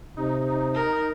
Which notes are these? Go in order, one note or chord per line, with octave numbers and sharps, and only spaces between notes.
C3 D#4
A#4